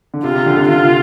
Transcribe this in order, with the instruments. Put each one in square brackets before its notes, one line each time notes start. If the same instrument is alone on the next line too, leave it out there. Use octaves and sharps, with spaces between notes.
[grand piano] D3
[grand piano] C3 [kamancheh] F4
[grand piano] C3
D3
C3
[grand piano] D3 [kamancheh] F4